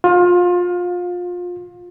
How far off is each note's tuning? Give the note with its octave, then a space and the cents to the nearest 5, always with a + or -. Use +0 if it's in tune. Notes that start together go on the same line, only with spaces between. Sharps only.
F4 +25